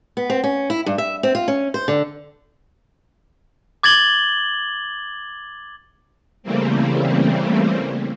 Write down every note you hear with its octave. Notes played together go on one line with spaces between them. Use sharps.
B3
C4
C#4
E4
G2
E5
C4
F4
C#4
C5
D3
D6 G#6 A6 F#7 G7
C#3 E3 G3 A3 A#3 C4